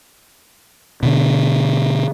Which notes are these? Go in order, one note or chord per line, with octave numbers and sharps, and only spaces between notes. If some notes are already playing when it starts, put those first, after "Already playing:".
B2 D3